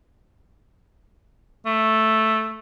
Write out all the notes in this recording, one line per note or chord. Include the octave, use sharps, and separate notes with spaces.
A3